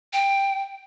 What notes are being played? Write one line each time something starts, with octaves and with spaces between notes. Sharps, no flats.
G5